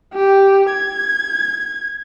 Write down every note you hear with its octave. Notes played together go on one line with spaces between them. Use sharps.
G4
G#6